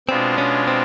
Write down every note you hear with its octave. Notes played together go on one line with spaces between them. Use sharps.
B2 G#3 B3 C4 D4 F4
C#4
C4